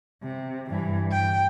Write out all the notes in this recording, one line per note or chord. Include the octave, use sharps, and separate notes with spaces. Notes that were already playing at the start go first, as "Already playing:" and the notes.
C3
G2 E3
G5